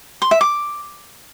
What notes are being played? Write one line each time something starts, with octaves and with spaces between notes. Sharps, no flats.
C6
E5
D6